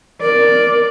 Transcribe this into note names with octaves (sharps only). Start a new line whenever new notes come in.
A#4 D5